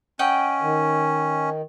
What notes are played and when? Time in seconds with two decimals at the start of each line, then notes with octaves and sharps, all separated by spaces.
0.19 C#4 D#5 F#5 G5
0.62 D#3